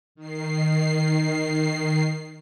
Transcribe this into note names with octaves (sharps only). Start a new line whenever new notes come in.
D#3 C7